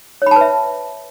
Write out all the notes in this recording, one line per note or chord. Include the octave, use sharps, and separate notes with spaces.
B4 C#5 E5 A5 B5